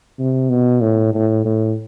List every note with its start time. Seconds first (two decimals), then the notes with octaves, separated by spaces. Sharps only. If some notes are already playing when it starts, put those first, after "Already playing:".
0.19 C3
0.50 B2
0.81 A2
1.14 A2
1.45 A2